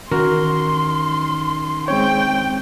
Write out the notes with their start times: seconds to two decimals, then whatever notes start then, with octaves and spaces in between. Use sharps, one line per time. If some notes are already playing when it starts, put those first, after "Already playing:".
0.11 D#3 E3 C#4 F#4 A#4 C6
1.88 G#3 C4 C#5 G5